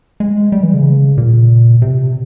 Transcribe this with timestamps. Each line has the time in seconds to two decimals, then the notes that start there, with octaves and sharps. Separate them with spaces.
0.20 G#3
0.52 G3
0.63 E3
0.74 C#3
1.18 A#2
1.82 C3